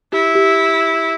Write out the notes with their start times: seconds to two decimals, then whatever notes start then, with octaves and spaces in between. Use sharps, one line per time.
0.13 E4 G4
0.35 G4